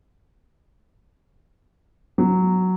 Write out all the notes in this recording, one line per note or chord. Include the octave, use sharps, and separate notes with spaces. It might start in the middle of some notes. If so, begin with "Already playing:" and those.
F#3